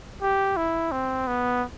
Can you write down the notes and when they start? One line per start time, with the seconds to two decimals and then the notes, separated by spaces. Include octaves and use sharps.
0.22 G4
0.57 E4
0.92 C4
1.27 B3